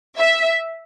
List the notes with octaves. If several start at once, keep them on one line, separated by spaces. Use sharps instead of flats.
E5